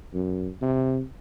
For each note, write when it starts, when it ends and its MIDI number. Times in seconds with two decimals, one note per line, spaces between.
0.13 0.49 42
0.62 1.01 48